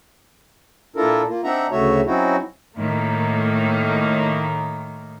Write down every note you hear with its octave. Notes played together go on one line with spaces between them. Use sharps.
A#2 D4 E4 F4 A4 A#4
A#3 F4
C4 D4 D#4 E5 F#5 A#5
D2 C#3 A3 F#4 C#5 E5
F#3 C4 C#4 D#4 E4 F#4
A2 D#3 A#3